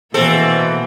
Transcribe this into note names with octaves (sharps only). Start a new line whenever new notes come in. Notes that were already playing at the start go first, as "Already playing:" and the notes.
B2 E3 A#3 C4 A4